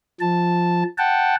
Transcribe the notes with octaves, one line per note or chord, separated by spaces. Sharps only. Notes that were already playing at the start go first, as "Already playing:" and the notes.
F3 A5
F#5 G5 A5